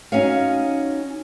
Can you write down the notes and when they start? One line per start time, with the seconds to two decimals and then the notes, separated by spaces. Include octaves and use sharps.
0.12 C#4 D#4 F#4 C#5 F5